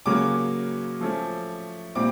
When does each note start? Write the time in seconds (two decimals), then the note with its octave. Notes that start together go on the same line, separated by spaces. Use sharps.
0.06 C#3 F#3 A#3 C#4 D6
1.01 F3 A3 C#4
1.95 A#2 G3 C4 D6